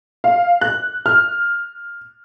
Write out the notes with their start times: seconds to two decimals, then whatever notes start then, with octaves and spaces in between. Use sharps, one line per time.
0.24 F5
0.61 F#6
1.06 F6